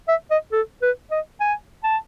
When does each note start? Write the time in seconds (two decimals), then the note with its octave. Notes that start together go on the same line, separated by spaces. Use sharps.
0.09 E5
0.31 D#5
0.52 A4
0.82 B4
1.11 D#5
1.40 G#5
1.84 A5